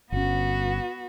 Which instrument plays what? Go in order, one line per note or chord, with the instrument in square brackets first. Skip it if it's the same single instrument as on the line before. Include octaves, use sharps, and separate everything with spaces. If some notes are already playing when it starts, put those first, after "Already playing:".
[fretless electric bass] G1 C#4 [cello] B3 F#4